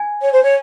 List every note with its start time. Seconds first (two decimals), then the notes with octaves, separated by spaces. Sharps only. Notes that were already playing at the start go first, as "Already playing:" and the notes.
Already playing: G#5
0.22 C#5
0.32 C5
0.43 C#5